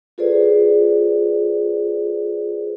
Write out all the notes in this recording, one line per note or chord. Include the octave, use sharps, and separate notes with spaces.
F4 G#4 A4 B4 C5 D5